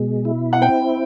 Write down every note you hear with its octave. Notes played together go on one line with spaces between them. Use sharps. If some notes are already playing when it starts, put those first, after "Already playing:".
Already playing: B2 G#3
E4
F#5
C4 G5